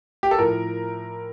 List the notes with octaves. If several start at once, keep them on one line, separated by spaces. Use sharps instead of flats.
G4
A4
A2 F3 A#4